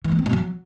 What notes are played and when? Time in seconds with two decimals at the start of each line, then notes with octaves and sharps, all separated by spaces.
0.04 E3
0.12 A#3
0.19 C4
0.26 B2
0.33 F#3